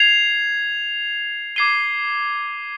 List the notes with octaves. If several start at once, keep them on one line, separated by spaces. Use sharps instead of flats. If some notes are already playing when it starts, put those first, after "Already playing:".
Already playing: G#6 C7 F7
D6 G#6 C7 D#7 G7